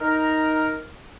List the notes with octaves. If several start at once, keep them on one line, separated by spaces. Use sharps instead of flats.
D#4 A#4